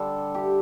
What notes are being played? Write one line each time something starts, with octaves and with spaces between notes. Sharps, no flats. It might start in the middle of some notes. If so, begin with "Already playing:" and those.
Already playing: D3 G3 D4 A4
G4